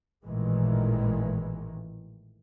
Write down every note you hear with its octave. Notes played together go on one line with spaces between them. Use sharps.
A1 A#2 D#3 E3 G#3